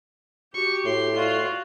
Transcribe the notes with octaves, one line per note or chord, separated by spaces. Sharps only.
F#4 G4 C#6
A2 C6
F4 F#4 D5